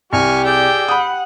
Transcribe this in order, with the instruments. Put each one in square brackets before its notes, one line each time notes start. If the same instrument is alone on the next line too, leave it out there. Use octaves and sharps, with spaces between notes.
[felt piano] C2 [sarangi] G4 [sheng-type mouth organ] G#5 C#6 F6
[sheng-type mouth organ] G#4 D5 E6 [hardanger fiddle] G5
[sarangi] F#5 [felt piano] B5 D#6